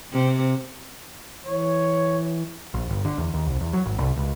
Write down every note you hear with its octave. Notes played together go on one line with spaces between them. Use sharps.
C3
E3 C#5
A#1
G1
D3
E2
D#2
C2
E2
F#3
G#1
C2
C#2